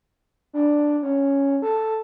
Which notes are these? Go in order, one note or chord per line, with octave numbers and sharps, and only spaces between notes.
D4
C#4
A4